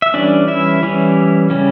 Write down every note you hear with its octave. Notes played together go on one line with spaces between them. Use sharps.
E5
E3 G3 C#4 D4 D5
E4 E5
E3 G3 C#4
C#3 G3 C#4